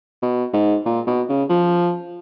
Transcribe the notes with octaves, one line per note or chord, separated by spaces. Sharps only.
B2
G#2
A#2
B2
C#3
F3